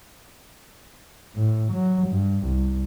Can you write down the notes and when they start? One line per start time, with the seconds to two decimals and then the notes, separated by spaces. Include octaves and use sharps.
1.36 A2
1.74 F#3
2.09 G2
2.47 C2